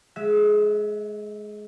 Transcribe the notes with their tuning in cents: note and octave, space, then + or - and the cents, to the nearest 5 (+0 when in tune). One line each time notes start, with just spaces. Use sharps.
G#3 +20 E5 -15